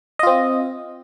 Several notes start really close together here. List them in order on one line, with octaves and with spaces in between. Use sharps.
D#5 F4 C4